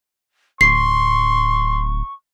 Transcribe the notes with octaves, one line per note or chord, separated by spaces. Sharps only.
D1 C6 C#6 C7